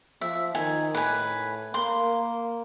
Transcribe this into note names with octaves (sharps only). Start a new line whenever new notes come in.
F3 E5
D#3 G#5
A2 B4 G#5
A#3 C6